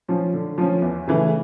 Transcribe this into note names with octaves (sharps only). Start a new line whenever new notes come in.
F3 C#4
D3
F3 C#4
E2
C#3 E3 A3